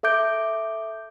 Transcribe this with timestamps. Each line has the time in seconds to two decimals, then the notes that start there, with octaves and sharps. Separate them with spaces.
0.03 A4 E5 D6 G6 D7